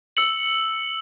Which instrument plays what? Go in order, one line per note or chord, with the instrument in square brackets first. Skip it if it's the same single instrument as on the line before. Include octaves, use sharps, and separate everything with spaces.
[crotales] E6 C#7 F#7